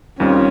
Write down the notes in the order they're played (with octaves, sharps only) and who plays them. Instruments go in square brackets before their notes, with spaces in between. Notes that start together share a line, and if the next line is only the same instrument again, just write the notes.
[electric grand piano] D#2 D#3 G3 C4 F4 [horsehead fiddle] C#4